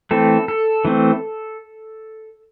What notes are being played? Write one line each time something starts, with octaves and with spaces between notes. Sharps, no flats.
E3 A3 C4 A4
A4
E3 A3 C4